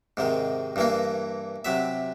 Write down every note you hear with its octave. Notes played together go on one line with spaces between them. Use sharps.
G#2 C3 D#3
G2 E3 A#3
C3 F#3 E5